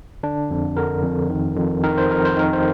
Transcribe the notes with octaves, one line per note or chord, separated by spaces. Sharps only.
D3 D4
F2
D3 A#4
F2
D#3
F2
D#3 A#4
C5
F2 A#4
C5
D#3 A#4
C5